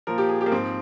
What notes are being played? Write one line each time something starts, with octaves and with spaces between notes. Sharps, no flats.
A#2 F3 A#4
G4
G#4
G4
A#3
G#2 F3 C4